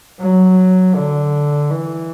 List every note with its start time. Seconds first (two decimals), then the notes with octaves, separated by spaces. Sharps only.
0.21 F#3
0.95 D3
1.70 E3